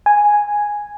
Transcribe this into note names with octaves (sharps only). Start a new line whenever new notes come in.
G#5